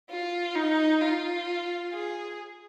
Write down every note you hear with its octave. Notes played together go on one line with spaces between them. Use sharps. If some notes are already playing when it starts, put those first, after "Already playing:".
F4
D#4
F4
G#4